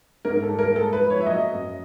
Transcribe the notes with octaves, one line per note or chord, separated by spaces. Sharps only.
G#2 A#4
A4
G3
A#4
G#3 A4
B4
F3
C#5
E5
F#3 D#5
F#2